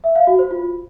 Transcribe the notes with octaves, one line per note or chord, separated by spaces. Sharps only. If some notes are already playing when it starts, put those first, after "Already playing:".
E5
F5
F#4
C5
F4